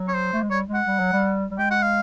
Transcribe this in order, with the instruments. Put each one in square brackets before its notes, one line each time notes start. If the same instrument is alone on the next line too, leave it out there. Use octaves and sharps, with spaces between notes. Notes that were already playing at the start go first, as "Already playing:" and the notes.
Already playing: [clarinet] F#3
[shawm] C#5
C5
[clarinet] A3
G#3
[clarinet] G3 [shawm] C#5
[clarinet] G#3
[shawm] F#5
[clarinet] G3
F#3
G3
G3
[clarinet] G#3 [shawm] G5
[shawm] F#5
F5